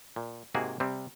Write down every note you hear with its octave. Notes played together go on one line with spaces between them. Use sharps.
A#2
G#2 C3 A#3 F#4 G#4
C3 G3 C4